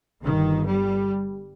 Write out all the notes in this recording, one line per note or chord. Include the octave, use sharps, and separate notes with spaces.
G1 G2 D#3
G3